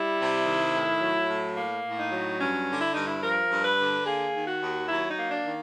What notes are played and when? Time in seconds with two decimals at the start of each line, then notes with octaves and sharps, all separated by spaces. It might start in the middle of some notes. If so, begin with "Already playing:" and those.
Already playing: G3 E4
0.18 C3
0.46 D#3
0.74 A2
1.01 F#3
1.29 A2
1.57 A#3
1.84 A2
1.98 D#4
2.12 F#3
2.39 G2 C#4
2.67 D3
2.81 E4
2.94 G2 D#4
3.06 E4
3.22 F3 A#4
3.50 G2
3.64 B4
3.78 D3
4.05 A#3 G#4
4.33 D#3
4.47 F#4
4.60 D#2
4.88 F#3 E4
5.09 D#4
5.16 A#3
5.29 D4
5.44 D#3